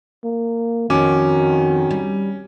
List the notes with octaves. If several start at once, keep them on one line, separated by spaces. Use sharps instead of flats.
A#3
F2 D#3 B3 C#4 F#4 D6
G3